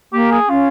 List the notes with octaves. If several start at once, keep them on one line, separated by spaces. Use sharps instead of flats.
A#3 G4
G#4
C#4 F4